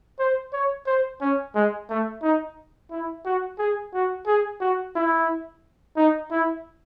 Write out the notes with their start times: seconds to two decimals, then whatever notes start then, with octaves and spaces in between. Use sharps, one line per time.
0.19 C5
0.53 C#5
0.86 C5
1.21 C#4
1.55 G#3
1.90 A3
2.22 D#4
2.91 E4
3.25 F#4
3.59 G#4
3.94 F#4
4.27 G#4
4.60 F#4
4.95 E4
5.97 D#4
6.31 E4